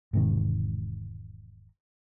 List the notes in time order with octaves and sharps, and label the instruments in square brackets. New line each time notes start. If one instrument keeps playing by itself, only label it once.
[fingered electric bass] E1 G#2 C3 D#3